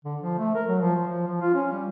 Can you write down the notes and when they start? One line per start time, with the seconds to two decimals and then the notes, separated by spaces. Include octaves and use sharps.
0.05 D3
0.22 F3
0.38 A3
0.55 A#4
0.68 F#3
0.81 F3
0.96 F3
1.08 F3
1.27 F3
1.41 F4
1.54 C#4
1.72 G3